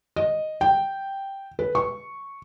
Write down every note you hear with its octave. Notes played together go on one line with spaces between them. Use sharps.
D#5
G5
B4
C#6